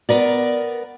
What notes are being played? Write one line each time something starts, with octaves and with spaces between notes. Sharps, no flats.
B3 A#4 D5